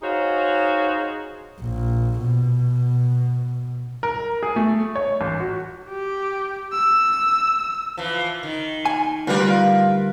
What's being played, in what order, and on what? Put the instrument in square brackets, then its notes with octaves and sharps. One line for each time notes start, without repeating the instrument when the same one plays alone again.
[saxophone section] D#4 F#4 G#4 C5 C#5 F5
[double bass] A#1
B2
[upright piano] A#4
G#4
A3
C#5
A1
F#4
[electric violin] G4
E6
[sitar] E3 F3
D#3
[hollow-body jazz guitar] G#5
[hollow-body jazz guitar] D2 G3 [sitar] F4 A#4 B4